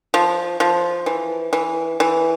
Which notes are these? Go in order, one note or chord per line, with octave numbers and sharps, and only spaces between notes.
F3
F3
E3
E3
E3